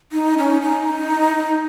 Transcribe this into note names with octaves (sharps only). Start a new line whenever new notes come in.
D#4
C#4
D#4